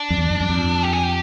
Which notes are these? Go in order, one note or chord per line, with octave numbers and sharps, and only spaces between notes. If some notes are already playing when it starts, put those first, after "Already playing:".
Already playing: D4
F2
E2
F2
F#2
F2
G4
G#4
G4